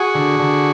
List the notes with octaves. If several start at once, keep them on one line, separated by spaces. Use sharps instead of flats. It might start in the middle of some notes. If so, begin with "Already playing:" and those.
Already playing: F#4 G#4
D3
D3